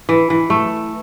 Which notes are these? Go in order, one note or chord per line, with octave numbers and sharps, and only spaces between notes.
E3
E3
A3